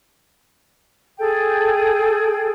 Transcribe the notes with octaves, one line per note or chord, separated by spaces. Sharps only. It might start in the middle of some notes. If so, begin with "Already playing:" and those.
G#4 A4 G5